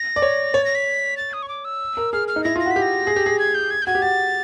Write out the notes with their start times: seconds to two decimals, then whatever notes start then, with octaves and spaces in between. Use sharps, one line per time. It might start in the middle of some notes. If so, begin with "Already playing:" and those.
Already playing: A#6
0.16 D5
0.22 C#5
0.54 C#5 A6
0.65 A#6
0.75 B6
1.17 A6
1.33 D#6
1.42 C#6
1.49 D6
1.65 E6
1.97 A#4
2.13 G#4 F6
2.28 F6
2.36 D#4
2.44 E4 A#6
2.56 F4 A#6
2.66 F#4 B6
2.76 G4
2.82 A#6
3.07 G#4
3.16 G4
3.26 G#4
3.39 G#6
3.55 G6
3.71 G#6
3.82 G6
3.86 F#4 G#6
3.95 G4
4.02 F#4 A6